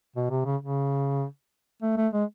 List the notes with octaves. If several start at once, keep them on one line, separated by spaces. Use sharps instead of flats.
B2
C3
C#3
C#3
A3
A3
G#3